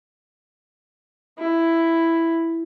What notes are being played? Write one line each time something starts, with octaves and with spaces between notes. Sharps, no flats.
E4